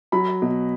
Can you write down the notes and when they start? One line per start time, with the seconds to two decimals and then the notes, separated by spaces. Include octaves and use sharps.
0.12 F#3 B5
0.42 B2